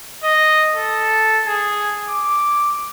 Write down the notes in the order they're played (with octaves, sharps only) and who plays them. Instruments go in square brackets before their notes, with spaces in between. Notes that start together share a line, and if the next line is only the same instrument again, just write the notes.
[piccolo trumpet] D#5
A4
G#4
D6